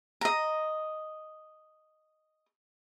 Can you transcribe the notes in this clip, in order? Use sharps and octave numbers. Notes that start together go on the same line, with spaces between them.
D#5 A#5